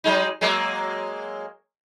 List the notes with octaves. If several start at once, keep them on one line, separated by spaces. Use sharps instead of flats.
F#3 G#3 D#4
F#3 G#3 A#3